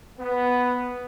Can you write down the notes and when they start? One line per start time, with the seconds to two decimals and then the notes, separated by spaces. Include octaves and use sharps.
0.19 B3